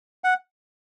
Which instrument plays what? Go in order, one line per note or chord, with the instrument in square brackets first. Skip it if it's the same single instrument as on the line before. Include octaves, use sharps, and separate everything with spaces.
[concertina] F#5